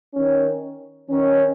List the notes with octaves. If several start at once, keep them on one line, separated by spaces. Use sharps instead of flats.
D#3 C#4
D#3 C#4